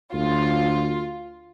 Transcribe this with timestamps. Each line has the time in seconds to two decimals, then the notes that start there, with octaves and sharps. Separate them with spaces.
0.14 D2 F4